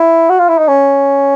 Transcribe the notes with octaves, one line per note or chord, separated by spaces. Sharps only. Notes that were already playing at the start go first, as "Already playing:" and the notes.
Already playing: E4
F#4
F4
E4
D#4
C#4